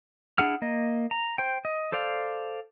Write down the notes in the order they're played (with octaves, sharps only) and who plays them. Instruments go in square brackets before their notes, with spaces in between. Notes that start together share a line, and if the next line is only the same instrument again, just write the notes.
[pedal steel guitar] D4 E4 G#4 F#5 F6
A#3 D#5
A#5
C5 G5
D#5
A4 C5 D5 F5